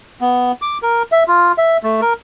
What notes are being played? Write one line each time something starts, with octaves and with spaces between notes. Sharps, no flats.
B3
D6
A#4
E5
F4
E5
A3
A#4